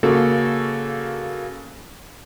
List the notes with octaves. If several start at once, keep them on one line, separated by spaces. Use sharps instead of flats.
C#3 A#3 F#4 A4